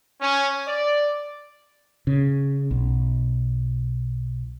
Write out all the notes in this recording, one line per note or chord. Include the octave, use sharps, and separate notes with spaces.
C#4
D5
C#3
B1